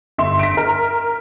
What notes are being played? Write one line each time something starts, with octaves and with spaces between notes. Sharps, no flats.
G1 E5 C6
B6 D7
A#4